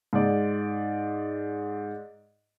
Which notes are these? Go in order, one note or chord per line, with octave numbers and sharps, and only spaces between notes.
G#2 D5